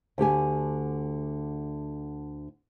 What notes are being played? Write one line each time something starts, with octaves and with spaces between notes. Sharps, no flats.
D2 D3 G4 G#5